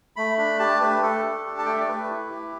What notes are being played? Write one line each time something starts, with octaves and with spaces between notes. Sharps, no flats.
A3 B5
D4 B5
G4 A5
A3 B4
A3 A4
D4
G4
A5
A3 G5
E5
D5
A3 B4
E4
G4